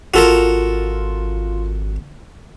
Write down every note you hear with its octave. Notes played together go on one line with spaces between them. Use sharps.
G#1 F4 F#4 A4 A#4 F7